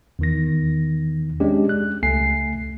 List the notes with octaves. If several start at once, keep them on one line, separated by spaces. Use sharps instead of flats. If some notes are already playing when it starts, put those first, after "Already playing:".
E2 D#3 A#6
G#3 C#4 D4 G4
F#6
C#2 A3 G#5 C7